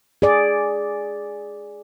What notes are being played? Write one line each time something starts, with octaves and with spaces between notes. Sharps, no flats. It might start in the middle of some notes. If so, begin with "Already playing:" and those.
G#4 D5